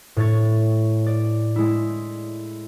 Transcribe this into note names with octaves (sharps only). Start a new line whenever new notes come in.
A2 C#5 A6
D5
G#3 E4